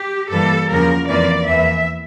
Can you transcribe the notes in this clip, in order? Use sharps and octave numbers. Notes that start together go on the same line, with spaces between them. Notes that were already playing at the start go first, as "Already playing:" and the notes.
Already playing: G4
G2 E3 G3 A#3 A4
E2 C#3 F3 A#3 A#4
F2 E3 A#3 D5
E2 E3 A#3 E5